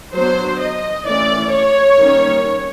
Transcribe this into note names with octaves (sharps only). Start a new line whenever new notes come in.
F#3 B3 D4 C5
D#5
E3 A3 C#4 D5
C#5
D#3 G3 A#3 C#4